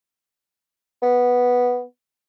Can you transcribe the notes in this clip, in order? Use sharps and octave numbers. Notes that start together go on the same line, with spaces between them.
B3